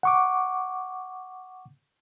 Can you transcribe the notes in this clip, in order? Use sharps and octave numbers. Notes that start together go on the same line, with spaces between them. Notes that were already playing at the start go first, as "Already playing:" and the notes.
F#5 C#6 D6